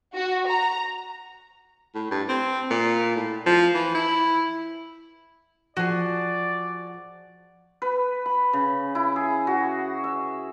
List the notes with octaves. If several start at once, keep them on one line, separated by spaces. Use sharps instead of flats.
F#4
A#5
A2
G2
C4
A#2
A2
F3
E3
E4
F3 F#4 G#4 D5
B4
B5
C#3
E4
G#4
F#4
E5